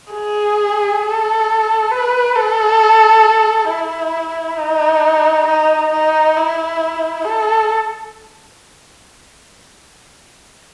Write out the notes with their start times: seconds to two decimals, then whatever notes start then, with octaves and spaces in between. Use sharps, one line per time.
0.13 G#4
1.03 A4
1.91 B4
2.36 A4
3.70 E4
4.59 D#4
5.47 D#4
5.93 D#4
6.37 E4
7.25 A4